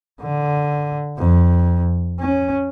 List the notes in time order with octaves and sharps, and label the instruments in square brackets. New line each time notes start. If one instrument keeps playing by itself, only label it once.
[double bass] D3
F2
C#4